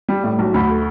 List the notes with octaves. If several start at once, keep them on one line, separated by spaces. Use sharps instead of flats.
G3
A2
B1
D2 B5
A3